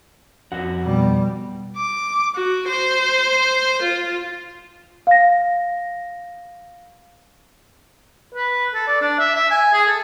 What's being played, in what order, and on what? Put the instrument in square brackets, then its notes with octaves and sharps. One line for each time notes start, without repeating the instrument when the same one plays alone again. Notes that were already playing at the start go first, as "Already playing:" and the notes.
[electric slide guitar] F2 F#4 F#5
[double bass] B2 G3
[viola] D6
F#4
C5
F4
[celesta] F5 A#6
[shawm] B4
A4
D5
D4
E5
E5
G#5
G#4
A4